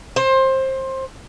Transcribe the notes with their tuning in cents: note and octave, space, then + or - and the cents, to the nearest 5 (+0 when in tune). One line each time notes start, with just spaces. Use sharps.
C5 +20